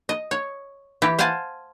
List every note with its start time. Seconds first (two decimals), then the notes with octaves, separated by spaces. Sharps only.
0.09 D#5
0.31 C#5
1.02 E3 G4
1.19 C5 F5 F#5 G#5 A5